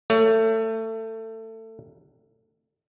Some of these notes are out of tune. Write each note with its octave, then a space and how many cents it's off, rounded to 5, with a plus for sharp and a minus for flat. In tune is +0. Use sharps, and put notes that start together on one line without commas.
A3 +20 C#5 +20